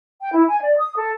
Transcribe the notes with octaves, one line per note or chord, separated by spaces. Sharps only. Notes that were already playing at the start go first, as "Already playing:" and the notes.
G5
E4
G#5
D5
D#6
A4